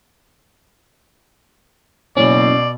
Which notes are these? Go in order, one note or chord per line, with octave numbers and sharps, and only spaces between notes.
F#1 B2 C#4 D5